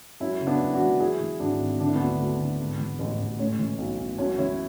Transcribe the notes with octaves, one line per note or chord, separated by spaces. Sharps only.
F#2 C#4 E4
C#3
B3 D4
F#1
D4 F#4
E3
F#2 E4 G#4
E3
G#1 D4 F#4
G#1
D3 D4
E4
D2 B3 D4
D2
D3
G#2
E3
A1
A1
A2 C#4
E3
B1
B1
F#2 C#4
E3 C#4 E4